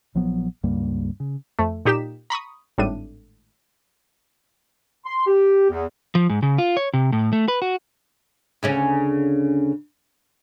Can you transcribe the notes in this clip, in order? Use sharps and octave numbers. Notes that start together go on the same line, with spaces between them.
A#1 F3 F#3 B3
C#2 G2 G3 A#3
C#3
F2 A3
A#2 D#4 G4 B6 E7
A#5 B5 C#6 D#6
G#1 A2 G3 D4 D#7
C6
G4
E2
F3
G#2
C#3
F4
C#5
C3
A2
A3
B4
F#4
D2 C#3 C#4